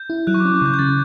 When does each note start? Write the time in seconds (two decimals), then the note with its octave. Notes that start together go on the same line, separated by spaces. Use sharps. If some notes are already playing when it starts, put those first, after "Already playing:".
Already playing: G6
0.10 E4
0.27 F#3 F#6
0.34 C#6
0.40 C#4 D6
0.62 C#3 G6
0.74 G6
0.79 C#3 A6